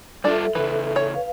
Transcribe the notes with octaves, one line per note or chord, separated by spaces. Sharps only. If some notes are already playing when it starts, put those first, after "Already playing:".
G3 D4 F4 A4 D5 E5
C#3 E3 B4
C#5
B4 F5